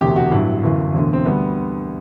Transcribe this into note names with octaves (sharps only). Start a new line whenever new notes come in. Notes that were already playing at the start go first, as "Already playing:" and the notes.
E1 D2 C3 G4
F#4
A1 G2 F#3 E4
G1 F#2 E3
E1 D2 D3
C4
D2 D3 G3 B3